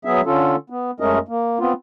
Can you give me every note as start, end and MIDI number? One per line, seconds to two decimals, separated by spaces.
0.05 0.21 54
0.05 0.21 59
0.05 0.21 68
0.05 0.21 76
0.26 0.56 50
0.26 0.56 61
0.26 0.56 65
0.26 0.56 69
0.70 0.91 59
1.00 1.19 42
1.00 1.19 56
1.00 1.19 57
1.00 1.19 61
1.00 1.19 70
1.00 1.19 75
1.28 1.59 58
1.59 1.73 59
1.59 1.73 60
1.59 1.73 65